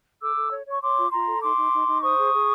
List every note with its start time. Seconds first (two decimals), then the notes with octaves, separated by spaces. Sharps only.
0.21 A4 D6 E6
0.36 A4
0.51 C#5
0.66 C#5
0.72 C#6
0.81 C#5 C6 D6
0.97 F4
1.11 F4 A#5 C6
1.27 A4
1.42 D#4 C6 D6
1.57 D#4
1.73 D#4
1.87 D#4
2.02 C5 C#6 D#6
2.17 G#4
2.33 G#4